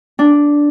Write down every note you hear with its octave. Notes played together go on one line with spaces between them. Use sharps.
D4